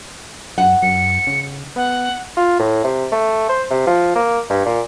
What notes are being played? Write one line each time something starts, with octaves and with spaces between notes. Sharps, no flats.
F#2 F#5
F#2 C#7
C#3
B3 F#5
F4
A2
C3
A3
C5
C3
F3
A#3
G2
A#2